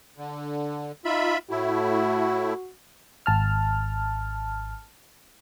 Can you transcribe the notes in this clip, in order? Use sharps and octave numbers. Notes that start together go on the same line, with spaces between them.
D3
D#4 F4 E5 B5
A2 A3 E4 F#4
G#1 A5 F6